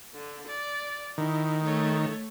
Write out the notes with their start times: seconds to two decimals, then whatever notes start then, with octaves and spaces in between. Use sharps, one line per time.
0.14 D3
0.47 D5
1.18 D#3 E4
1.64 A3 C#5